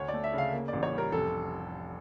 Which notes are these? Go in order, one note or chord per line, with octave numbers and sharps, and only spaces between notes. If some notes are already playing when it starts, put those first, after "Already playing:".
Already playing: D2 C#5
D5
A3
E5
C#3 F5
A#3
A1 D5
C#5
G3 A#4
F1 A4